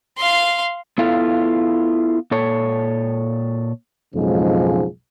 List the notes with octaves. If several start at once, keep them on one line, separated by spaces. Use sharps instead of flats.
F5 C6
B3 E4 F4 A4 F5
A#2 A4 C#5
B1 F2 G#2 C#3 F3 G#3